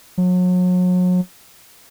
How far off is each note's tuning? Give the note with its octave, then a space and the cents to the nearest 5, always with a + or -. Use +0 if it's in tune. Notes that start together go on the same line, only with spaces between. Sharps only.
F#3 -35